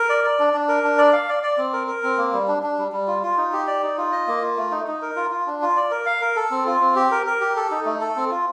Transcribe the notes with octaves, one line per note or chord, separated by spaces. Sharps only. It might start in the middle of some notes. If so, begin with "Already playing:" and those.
Already playing: A#4
D5
D5
D4
D4
A#4
D4
D5
F5
D5
D5
C4
A#4
A#4
C4
A#3
G3
D4
D4
G3
G3
F4
F4
D#4
G4
D5
D#4
F4
D#5
A#3
F4
A3
D#4
D#4
A#4
F4
F4
D4
F4
D5
A#4
F5
A#4
A4
C4
F4
C4
G4
A#4
A#4
G4
A4
D#4
A3
A4
C4
F4